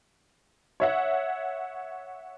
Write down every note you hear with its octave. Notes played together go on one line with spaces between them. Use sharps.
C#5 E5 F#5